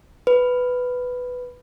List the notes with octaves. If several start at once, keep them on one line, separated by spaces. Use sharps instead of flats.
B4